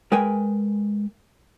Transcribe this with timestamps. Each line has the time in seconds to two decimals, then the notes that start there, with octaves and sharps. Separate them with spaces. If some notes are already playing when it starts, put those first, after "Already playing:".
0.12 G#3 A#4 B4 G5 G#5